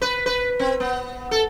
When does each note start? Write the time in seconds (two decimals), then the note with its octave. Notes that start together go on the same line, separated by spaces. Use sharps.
0.02 B4
0.26 B4
0.59 C4
0.80 B3
1.31 A4